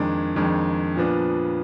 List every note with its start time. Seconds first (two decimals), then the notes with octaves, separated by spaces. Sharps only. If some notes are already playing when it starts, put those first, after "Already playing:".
Already playing: F2 D#3 G#3 D4
0.36 F2 D#3 G#3 D4
0.96 A#2 F3 B3 D4